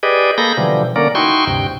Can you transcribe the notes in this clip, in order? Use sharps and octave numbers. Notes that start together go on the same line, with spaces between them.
G4 G#4 B4 D5 D#5
A#3 G#4 A4 B5 G6 A#6
B2 D3 E3 F3 G3
D3 A#3 C#4 A#4 D5
D#4 E4 F#4 G5 C6 C#6
D2 G2 C3 G5